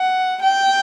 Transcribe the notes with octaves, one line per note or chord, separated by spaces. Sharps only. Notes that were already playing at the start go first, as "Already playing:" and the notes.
Already playing: F#5
G5